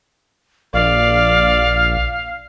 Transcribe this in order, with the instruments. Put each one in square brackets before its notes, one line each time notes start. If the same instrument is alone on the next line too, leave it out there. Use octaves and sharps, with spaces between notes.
[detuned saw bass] A#1 [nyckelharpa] D5 [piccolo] F5